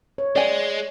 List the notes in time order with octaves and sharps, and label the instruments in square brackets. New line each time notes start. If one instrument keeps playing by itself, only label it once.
[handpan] C#5
[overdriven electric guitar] G#3 [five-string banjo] D5 G#5